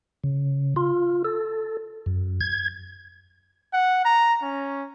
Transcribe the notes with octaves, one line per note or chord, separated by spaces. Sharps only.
C#3
F4
A4
F#2
G#6
F#5
A#5
C#4